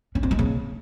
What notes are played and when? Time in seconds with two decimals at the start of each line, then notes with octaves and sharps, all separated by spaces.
0.15 C#4
0.23 C4
0.31 G#3
0.39 C#3